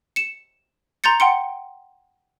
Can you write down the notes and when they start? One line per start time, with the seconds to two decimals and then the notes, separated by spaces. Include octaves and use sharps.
0.16 C#7 E7
1.04 A#5 C6 G6 A6 C#7
1.20 F#5 G5 C6 C#7